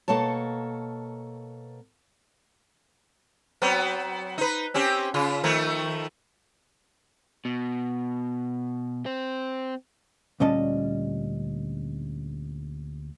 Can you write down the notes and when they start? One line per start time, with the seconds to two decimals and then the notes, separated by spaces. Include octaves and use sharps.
0.08 B2 A#3 A4 C#5 A5
3.62 F#3 B3 C4
4.38 D#4 B4
4.74 C4 C#4 G4
5.14 C#3 F4
5.44 D#3 F3 A3
7.45 B2
9.06 C4
10.40 D2 A#2 G3 C#4 D#5 A5